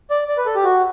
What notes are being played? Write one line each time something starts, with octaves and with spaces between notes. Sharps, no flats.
D5
D5
B4
A4
G4
F#4